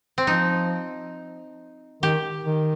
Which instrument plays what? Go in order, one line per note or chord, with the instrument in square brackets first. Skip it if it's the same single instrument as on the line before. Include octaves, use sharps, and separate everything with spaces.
[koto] C4
[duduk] F3 [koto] D#4
[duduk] D#3 [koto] G4
[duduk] D#3